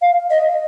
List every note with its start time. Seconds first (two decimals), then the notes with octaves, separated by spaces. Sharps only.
0.02 F5
0.30 D#5